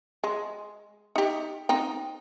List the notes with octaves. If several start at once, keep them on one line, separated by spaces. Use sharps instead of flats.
G#3
D#4 G4
C4 D#4 G5